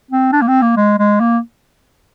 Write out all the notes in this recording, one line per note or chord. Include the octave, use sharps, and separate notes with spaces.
C4
D4
A#3
C4
A#3
G#3
G#3
A#3